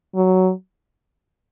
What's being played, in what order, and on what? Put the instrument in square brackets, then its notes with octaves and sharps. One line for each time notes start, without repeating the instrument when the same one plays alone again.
[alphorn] F#3